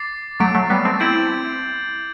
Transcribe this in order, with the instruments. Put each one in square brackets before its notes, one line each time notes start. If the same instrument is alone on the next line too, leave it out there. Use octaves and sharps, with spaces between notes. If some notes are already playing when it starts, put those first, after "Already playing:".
Already playing: [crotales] D6 A6 C7
[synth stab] F#3 A3 [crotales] D6 A6 D7
[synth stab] F#3 A3
G3 B3
A3 C4
[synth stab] C4 E4 [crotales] G6 D7 F#7